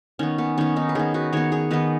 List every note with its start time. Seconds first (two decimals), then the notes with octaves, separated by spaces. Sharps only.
0.19 D#3 B3 C#4
0.38 B3
0.58 D#3 B3 C#4
0.76 B3 D#4
0.89 B4
0.95 D#3 B3 G#4 C#5
1.14 F#4 B4
1.33 D#3 B3 G#4 C#5
1.52 G#4 C#5
1.71 D#3 B3 B4 D#5